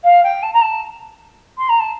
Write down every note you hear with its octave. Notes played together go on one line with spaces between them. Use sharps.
F5
G5
A5
A#5
A5
C6
A#5
A5